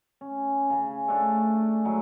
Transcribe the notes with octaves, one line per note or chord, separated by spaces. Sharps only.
C#4
C#3 G#5
A3 D4 C#5
A2 F#3 G#3